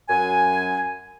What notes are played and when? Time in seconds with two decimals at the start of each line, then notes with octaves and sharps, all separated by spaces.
0.09 F#2 G#5